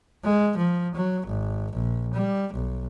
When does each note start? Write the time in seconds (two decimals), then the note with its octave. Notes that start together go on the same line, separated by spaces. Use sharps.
0.24 G#3
0.57 F3
0.95 F#3
1.27 G#1
1.73 A#1
2.14 G3
2.54 B1